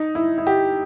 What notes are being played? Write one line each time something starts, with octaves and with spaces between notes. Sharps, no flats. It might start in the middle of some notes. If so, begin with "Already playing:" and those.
Already playing: D#4
E4
E4
G4